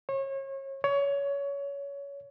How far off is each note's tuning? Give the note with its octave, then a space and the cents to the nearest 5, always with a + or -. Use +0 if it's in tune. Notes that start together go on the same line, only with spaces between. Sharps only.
C#5 -35
C#5 +20